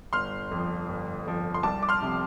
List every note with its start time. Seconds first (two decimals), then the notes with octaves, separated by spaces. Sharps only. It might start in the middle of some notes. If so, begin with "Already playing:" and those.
0.13 G1 C6 F6
0.51 F2 F3
0.89 G1
1.27 F2 F3
1.54 C6
1.63 C2 A5 D6
1.83 D6
1.89 C6 F6
2.02 C3 F3